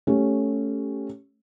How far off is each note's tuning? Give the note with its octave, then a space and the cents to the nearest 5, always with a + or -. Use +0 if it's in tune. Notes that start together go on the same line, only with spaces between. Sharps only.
A3 +0 C#4 +0 G4 +0